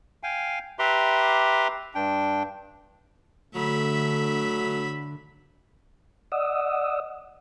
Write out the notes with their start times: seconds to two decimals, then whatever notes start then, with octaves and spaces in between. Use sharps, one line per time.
0.23 F5 G5 G#5
0.79 G4 B4 E5 A#5 C6 D6
1.95 G2 D4 G5
3.55 D3 F#3 A3 E5 B5
6.32 D5 D#5 F#5 D#6 E6